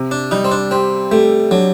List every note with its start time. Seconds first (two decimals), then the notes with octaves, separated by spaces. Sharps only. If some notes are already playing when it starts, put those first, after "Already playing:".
Already playing: C3
0.11 D4
0.31 G3 D#4
0.44 C4
0.51 D4
0.71 C4 G4
1.11 A3 G4
1.51 F#3 D4